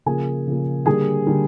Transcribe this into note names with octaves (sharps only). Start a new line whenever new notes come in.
C#3 F3 A#3 G#4 G#5
C#3 F3 A#3
D3 G3 A#3 D4 G#4 G#5
D3 G3 A#3 D4